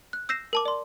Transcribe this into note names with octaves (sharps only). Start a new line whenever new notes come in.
F#6
E6 G6 A#6 C7 E7
A#4 A5 D6
D5 C6